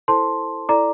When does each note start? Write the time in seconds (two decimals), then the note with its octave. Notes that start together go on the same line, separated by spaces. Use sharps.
0.08 E4 A4 C5 A5 C6
0.69 E4 A4 D5 A#5 D6